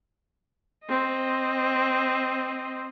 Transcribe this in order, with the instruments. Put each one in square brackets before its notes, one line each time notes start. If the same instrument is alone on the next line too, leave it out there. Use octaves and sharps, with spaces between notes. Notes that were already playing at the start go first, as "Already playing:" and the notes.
[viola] C4 D#5